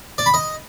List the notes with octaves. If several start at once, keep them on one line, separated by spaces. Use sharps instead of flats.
D5
B5
D#5